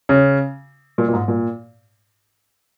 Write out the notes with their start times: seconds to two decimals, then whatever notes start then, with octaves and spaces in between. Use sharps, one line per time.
0.09 C#3
0.98 A#2
1.08 A#2
1.13 G#2
1.28 A#2